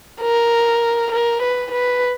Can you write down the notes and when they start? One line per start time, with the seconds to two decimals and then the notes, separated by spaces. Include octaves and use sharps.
0.21 A#4
1.12 A#4
1.42 B4
1.72 B4